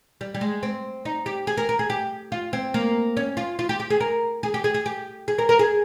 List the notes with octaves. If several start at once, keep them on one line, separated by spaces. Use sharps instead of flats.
G3
G3
G#3
C4
D#4
G4
G#4
A#4
A#4
G#4
G4
F4
C4
A#3
C#4
F4
F4
G4
G4
G#4
A#4
G#4
G4
G#4
G#4
G4
G#4
A#4
A#4
G#4